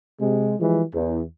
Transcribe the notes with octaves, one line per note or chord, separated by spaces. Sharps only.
C3 G#3
E3 F3 G3 G#3
E2